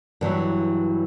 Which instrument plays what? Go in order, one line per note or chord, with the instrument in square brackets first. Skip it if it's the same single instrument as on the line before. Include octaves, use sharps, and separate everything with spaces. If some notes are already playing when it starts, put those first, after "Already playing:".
[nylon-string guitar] G2 E3 F#3